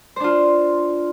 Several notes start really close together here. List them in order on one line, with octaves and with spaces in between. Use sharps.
C5 D4 F4